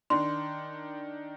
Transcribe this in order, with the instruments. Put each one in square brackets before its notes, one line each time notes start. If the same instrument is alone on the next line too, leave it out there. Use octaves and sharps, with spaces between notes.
[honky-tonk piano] D#3 D4 [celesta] C6